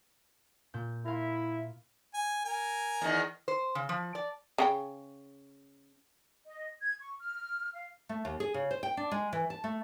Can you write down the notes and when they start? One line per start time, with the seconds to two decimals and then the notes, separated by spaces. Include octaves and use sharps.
0.74 A#2 G6
1.06 E4 A#4 F5 C6
2.14 G#5
2.45 A#4 G#5
3.02 E2 D#3
3.48 C5
3.75 C#3
3.89 F3
4.15 D5
4.58 C#3 F#5 G5
6.46 D#5
6.81 G#6
7.01 C#6
7.20 F6
7.74 F5
8.09 A3
8.25 D#2
8.40 G#4
8.54 C#3
8.71 C5
8.83 G5
8.97 D4
9.11 G#3
9.33 E3
9.50 A5
9.64 A3